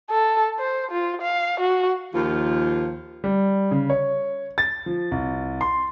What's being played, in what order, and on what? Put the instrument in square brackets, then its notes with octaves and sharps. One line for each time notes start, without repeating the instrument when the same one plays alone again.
[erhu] A4
C5
F4
F5
F#4
[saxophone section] D#2 D#3 F3 F4
[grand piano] G3
C#3
C#5
A6
F3
C2
C6